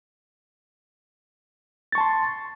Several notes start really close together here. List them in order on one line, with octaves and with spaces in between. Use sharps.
A6 C#6 A5 C6